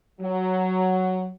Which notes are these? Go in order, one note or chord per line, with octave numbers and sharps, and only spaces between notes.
F#3